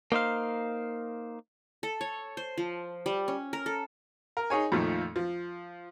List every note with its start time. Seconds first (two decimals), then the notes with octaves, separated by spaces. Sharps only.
0.12 A#3 D#4 C5 F5
1.83 A4
2.01 C#5
2.37 C5
2.58 F3
3.06 G3
3.28 C#4
3.53 A#4
3.66 A4
4.37 A#4
4.50 D#4 G#4 C#5 G#5
4.72 F2 A#2 D#3 F3 A3 F4
5.16 F3